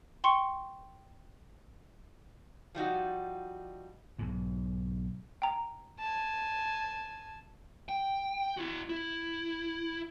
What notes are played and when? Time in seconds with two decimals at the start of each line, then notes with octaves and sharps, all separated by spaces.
0.24 G5 C6 C#6 C#7
2.75 F3 G3 D#4 F#4
4.19 B1 G#2
5.42 G5 A#5
5.98 G#5 A5
7.89 G5
8.57 E4 F#4
8.89 E4